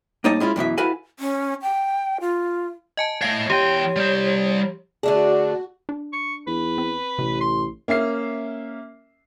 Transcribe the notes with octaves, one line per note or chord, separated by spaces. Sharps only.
G2 A#3 D#4 C#5 D#5 A5
G#3 C#4 E4 F4
F#2 B2 E3 E5
E4 F#4 A4 B4 F5 G#5
C#4
G5
F4
D#5 G#5 A5
A3 C#5 F5 C7
E2 G4 C#5 G5
G3 C5
D3 A3 D4 F#4 G#4
D4
C#6
E2 B4
C4
A1 C3
C6
A#3 C#4 E5 C7